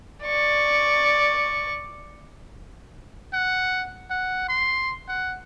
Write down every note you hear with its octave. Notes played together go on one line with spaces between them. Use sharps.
D5 C#6
F#5
F#5
C6
F#5